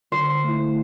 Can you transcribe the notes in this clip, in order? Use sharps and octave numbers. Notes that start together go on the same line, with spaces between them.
D3 C5
A3 E4